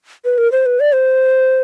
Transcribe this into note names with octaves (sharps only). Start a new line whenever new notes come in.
B4
A#4
C5
B4
D5
C5